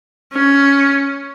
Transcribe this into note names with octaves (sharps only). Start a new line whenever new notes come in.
C#4